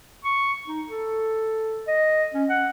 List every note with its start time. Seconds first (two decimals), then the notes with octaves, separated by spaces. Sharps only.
0.24 C#6
0.67 D#4
0.88 A4
1.88 D#5
2.34 C#4
2.49 F#5